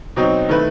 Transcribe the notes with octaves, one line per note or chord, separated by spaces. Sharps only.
B2 F#3 C4 D#4
D#3 A3 E4 B4